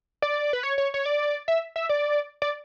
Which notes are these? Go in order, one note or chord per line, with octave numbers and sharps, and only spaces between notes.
D5
B4
C#5
C#5
C#5
D5
E5
E5
D5
D5